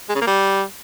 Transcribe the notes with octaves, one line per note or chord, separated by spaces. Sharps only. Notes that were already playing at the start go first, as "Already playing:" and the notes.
G#3
C#3
A#3
G3